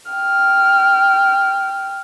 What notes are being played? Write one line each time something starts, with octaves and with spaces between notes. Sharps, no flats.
G5 F6